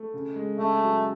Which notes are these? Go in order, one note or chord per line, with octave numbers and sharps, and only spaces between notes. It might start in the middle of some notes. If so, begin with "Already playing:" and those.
Already playing: A3
C#3
G#3
C#3 A3
F#3